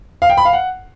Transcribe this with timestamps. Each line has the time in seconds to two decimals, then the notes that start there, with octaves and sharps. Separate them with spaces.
0.22 F5
0.30 G5
0.37 B5
0.45 F5
0.53 F#5